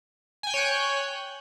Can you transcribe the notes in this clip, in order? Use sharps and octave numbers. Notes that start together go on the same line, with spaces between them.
C#5 G5 G#5 F#6 G6